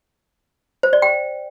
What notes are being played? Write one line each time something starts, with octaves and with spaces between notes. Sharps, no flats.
C5
D5
G5